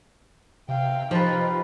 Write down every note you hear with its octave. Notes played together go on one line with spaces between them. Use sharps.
C3 F5 G5
F3 D#4 F4 G4 B4